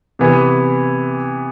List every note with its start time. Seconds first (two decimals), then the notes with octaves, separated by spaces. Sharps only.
0.19 C3 E3 B3